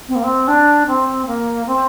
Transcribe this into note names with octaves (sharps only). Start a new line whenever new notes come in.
C4
A#3
C4
D4
C4
A#3
C4